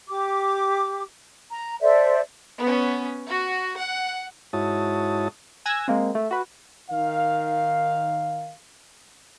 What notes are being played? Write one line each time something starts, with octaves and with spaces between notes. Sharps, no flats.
G4 D6
A#5
A4 C5 D5 E5
B3 C#4
F#4
F#5
G#2 E4 F#4 C#5 A5 D#6
G#5 E6 F#6 G#6 A#6
G#3 A#3 C4
A3
F#4 B4
D#3 F5